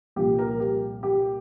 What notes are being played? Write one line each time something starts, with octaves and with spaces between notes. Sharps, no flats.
C2 A#2 F3 G4
A#4
G4
G4